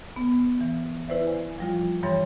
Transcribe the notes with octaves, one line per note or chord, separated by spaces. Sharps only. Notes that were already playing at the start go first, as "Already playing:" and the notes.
B3
E3
E4 B4 C5 D5 E5
G#5
F3 G3 F4
G2 E3 G3 C#5 C6 A6